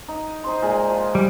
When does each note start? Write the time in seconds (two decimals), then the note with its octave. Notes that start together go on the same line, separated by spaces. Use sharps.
0.08 D#4
0.44 D#4 C5 C6
0.62 A#2 G#3
0.89 F3
1.15 G3